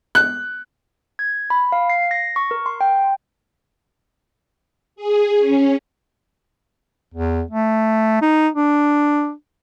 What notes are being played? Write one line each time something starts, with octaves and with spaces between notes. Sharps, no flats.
F#6
G#6
B5
F5
C7
A#6
C#6
A#4
C6
G5
G#4
C#4
E2
A3
D#4
D4